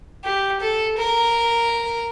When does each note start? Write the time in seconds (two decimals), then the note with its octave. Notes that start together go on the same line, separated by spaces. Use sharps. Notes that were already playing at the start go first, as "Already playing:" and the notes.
0.24 G4
0.61 A4
0.98 A#4